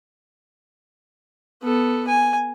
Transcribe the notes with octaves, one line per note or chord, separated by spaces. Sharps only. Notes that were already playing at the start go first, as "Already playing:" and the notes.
B3 A4
G#5